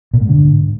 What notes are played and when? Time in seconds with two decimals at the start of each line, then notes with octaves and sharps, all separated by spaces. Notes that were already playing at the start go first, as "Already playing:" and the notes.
0.14 A#2
0.21 G#2
0.29 D3